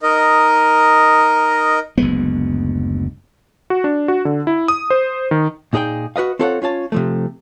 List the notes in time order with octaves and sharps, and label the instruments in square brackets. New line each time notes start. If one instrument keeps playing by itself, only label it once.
[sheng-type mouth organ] D#4 A#4 D#5
[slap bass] F#1 D2 G#3 B3
[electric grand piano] F#4
D4
F#4
D3
E4
D#6
C5
D#3
[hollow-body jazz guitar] A#2 D#4 G#4 C5 G5
F#4 B4 D#5 F5
C4 F4 A4 C#5 D5 F#5
C#4 F4 C#5 A5
C3 F3 A3